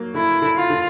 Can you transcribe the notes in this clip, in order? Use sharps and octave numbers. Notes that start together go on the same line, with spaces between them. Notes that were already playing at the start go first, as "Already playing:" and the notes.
Already playing: F#3 A#3
D3 E4
D3
F4
D3